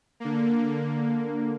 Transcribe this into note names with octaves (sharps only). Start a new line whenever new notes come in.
D3 A#3